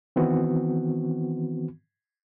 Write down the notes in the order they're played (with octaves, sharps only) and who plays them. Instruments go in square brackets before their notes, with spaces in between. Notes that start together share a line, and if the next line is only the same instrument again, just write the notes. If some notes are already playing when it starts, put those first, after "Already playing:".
[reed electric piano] D#3 E3 B3 C4 F#4